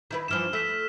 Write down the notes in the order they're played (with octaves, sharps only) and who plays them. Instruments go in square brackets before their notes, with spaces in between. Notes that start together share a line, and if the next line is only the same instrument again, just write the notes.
[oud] D#3 E4 B4
[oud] G2 E3 F3 [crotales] F6 E7
[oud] A3 [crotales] E6 B6 E7